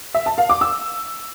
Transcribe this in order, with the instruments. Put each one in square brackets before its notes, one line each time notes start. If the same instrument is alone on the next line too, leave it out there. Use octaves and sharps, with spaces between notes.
[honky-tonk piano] E5
A5
F5
D6
E6